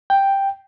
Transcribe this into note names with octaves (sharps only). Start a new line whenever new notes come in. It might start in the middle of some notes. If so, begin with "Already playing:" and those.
G5